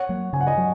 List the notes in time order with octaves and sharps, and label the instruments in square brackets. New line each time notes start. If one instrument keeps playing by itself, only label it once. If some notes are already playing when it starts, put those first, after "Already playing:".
Already playing: [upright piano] C#5 F#5
[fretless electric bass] F#3 A#3
[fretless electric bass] C#3 [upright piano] G#5
[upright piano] F#5
D#5 G#5
[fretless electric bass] F#3